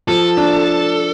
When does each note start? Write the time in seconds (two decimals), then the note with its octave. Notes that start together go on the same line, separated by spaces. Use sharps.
0.08 F3 A4
0.37 D4